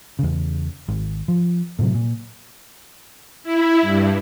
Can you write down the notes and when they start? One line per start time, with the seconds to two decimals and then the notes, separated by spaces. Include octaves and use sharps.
0.19 E2 C#3
0.88 G#1
1.28 F3
1.79 A2 C3 F#3
1.94 A#2
3.43 E4
3.81 G2